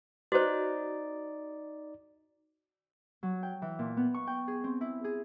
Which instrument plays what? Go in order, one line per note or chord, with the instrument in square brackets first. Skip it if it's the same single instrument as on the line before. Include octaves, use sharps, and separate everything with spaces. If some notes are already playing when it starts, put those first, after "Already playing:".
[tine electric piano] D#4 D5 [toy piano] F#4 C5
[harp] F#3
G5
E3
A#2
B3
C#6
G5
G#4
C4
E4
G#4